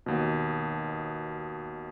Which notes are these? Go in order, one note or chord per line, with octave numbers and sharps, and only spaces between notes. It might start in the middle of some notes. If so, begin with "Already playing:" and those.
D#2 B2